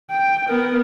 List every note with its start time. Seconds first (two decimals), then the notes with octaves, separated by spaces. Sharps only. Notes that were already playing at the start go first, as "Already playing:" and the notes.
0.10 G5
0.49 B3 A#4